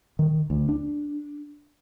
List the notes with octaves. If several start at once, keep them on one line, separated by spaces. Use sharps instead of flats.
D#3
D2
D4